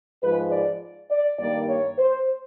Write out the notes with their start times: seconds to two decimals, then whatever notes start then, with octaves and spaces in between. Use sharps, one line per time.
0.23 G#2 F3 G#3 B4
0.52 D5
1.11 D5
1.39 G2 D#3 G3 A#3 D5
1.69 C#5
1.98 C5